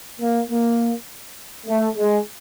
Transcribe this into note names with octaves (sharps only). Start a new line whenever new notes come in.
A#3
A#3
A3
G#3